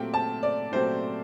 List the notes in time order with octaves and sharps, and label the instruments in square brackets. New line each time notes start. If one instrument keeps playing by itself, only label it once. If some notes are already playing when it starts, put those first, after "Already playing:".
Already playing: [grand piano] A#2 F#3 A3 C4 G4 [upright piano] G5
[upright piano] A5
D5
[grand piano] A#2 F#3 A3 C4 G4 [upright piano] C5